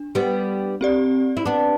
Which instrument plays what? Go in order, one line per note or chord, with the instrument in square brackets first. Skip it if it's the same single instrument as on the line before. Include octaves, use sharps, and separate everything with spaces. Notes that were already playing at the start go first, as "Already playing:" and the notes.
Already playing: [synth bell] D4
[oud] G3 B3
[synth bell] C4 G4 D5
[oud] E4
B3 D4